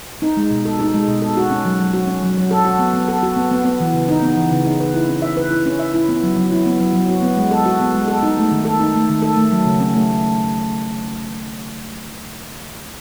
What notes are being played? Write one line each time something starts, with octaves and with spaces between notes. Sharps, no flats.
D#4
G#3
B2
A4
D#4
G#3
B2
A4
F#4
C#4
F#3
F#3
F#4
C#4
F#3
F#3
A4
F#4
B3
B3
A4
F#4
B3
B3
B3
E3
C#3
D#4
B3
E3
C#3
D#4
B4
E4
C#4
E5
B4
E4
C#4
E5
E4
B3
F#3
F#3
E4
B3
F#3
F#3
F#4
B3
G#3
A4
F#4
B3
G#3
A4
D#4
A3
D#3
A4
D#4
A3
D#3
A4
A3
F#3
C#3
C#4
A3